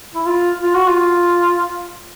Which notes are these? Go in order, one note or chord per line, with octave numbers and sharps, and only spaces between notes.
E4
F4
F4
F#4
F4